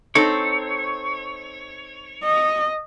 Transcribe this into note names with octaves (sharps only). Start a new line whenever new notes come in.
C4 D#4 A4 C#5
D#5